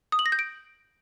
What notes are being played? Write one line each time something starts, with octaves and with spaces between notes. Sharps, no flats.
D#6
F#7
A#6
G6
D7